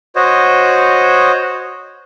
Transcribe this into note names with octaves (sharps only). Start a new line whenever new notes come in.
F#4 C5 C#5 D#5